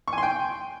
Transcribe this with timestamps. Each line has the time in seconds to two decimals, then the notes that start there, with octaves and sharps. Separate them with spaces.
0.08 C#6
0.13 G#5
0.18 C6
0.23 G5